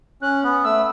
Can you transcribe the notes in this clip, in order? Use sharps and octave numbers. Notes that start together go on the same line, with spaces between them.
C#4 F#6
B3
A3 E6